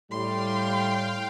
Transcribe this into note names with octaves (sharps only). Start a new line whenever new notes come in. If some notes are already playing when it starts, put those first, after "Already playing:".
A2 G3 F5 G5 C6